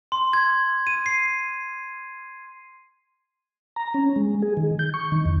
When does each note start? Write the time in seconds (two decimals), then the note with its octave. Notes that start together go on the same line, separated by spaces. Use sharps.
0.12 C6
0.33 G#6
0.87 D#7
1.06 C7
3.76 A#5
3.94 C#4
4.16 G#3
4.42 G#4
4.57 D#3
4.79 G6
4.94 C#6
5.12 D#3
5.26 E2